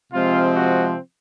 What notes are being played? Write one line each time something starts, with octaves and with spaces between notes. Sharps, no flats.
C3 F3 G#3 C4 F4
F#4